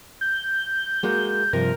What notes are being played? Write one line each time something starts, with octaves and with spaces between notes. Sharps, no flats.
G6
G#3 A#3 F#4
G2 C3 F3 A#4